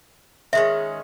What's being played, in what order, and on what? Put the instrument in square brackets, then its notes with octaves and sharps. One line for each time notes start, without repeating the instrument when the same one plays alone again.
[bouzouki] D#3 G#3 C#4 [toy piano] E5